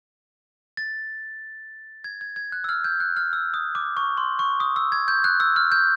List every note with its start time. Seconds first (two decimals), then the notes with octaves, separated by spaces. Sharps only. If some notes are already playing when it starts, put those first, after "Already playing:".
0.77 A6
2.04 G#6
2.21 G#6
2.36 G#6
2.52 F#6
2.64 E6
2.69 F6
2.84 G6
3.00 F#6
3.16 F6
3.33 E6
3.54 D#6
3.75 D6
3.97 C#6
4.17 C6
4.39 C#6
4.60 D#6
4.76 E6
4.92 G#6
5.08 G6
5.24 F#6
5.40 E6
5.56 F6
5.72 G6